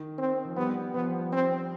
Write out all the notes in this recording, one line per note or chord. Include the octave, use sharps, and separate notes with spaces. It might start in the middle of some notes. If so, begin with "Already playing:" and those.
Already playing: D#3
C4
F3
G3 B3
F3 B3
C4